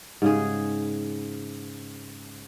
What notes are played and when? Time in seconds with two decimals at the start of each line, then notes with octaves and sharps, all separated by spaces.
0.22 G#2 C#3 G#4